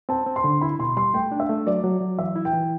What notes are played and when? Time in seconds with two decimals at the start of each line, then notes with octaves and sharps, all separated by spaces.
0.09 C4 A5
0.26 C4
0.36 C6
0.44 D3
0.61 E4 B5
0.79 B2 C6
0.97 G3 C6
1.14 A3 G5
1.32 D4
1.40 E5
1.49 A3
1.66 F#3 D5
1.84 F#3
2.01 F#3
2.18 E3 E5
2.36 E4
2.45 G5
2.53 E3